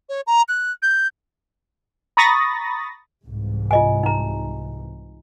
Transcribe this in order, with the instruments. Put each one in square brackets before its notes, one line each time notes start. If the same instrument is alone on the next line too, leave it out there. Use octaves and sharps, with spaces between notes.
[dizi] C#5
A#5
F#6
G6
[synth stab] A#5 B5 C#6 D#6 A6 A#6
[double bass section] C2 G#2 E3
[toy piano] F4 D#5 G#5
D#4 A#5